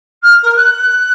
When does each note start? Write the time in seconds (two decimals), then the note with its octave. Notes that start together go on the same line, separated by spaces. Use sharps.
0.23 F6
0.42 A#4
0.56 F#6